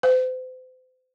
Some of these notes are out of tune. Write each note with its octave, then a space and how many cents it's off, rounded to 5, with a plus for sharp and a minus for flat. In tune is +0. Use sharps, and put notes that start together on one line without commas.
C5 -40